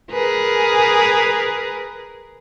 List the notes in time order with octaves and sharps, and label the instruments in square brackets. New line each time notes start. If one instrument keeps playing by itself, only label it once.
[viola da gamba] G#4 A#4 B4